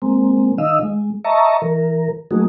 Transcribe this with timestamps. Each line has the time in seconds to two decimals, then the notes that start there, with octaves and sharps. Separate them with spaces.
0.02 G#3 A#3 C4
0.58 D#3 D#4 D#5 F5 E6
0.83 G#3
1.24 D#5 E5 A5 A#5 C#6
1.62 E3 A#4
2.31 F#3 A3 A#3 D#4 F#4 G#4